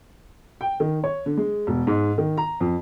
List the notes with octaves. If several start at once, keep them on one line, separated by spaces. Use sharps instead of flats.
G5
D#3
C#5
D3
G#3
E1
G#2
D#3
A#5
F2